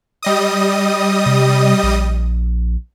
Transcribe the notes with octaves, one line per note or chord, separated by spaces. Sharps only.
G3 D#5 D#6
C3
A#1